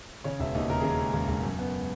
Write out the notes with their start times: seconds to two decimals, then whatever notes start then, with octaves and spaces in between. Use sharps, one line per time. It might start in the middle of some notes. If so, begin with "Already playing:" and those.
0.24 C#3 C#5
0.40 E1 E5
0.55 D#2 D#5
0.70 C#3 A#4
0.80 G#4
0.84 C#3 A#4
0.99 G#3
1.14 C#3
1.28 E1
1.43 F#2
1.59 B3